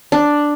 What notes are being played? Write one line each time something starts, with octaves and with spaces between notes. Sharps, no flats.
D4